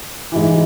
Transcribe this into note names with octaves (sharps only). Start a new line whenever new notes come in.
G#2 E3